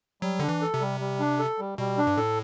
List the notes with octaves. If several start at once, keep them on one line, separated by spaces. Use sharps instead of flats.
F#3 G3
D3 D4
E3
A4
C3
G3
G3
D4
A4
G3
B2 G3
D4
G2
A2 A4